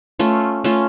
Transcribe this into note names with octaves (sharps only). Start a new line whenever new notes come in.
A3 C#4 F4
A3 C#4 F4